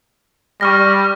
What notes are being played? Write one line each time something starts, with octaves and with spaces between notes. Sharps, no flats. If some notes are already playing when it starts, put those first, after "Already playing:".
G3 C#6 F6 A#6